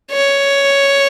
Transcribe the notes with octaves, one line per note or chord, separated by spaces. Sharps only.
C#5